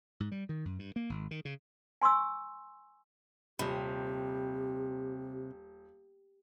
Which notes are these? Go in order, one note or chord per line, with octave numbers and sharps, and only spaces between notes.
G#2
G3
D#3
F#2
G2
A#3
G#1
D#3
C#3
G#5 C6 C#6 E6
D#1 C3 G4 B5